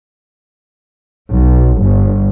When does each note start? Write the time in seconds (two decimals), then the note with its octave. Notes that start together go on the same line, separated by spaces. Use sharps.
1.33 B1
1.80 G1